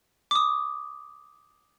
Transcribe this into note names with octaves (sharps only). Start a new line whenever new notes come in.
D6 D#6